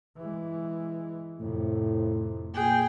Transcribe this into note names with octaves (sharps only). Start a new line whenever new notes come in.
E3 G#3
F2 A2 C3
A#2 G#4 G5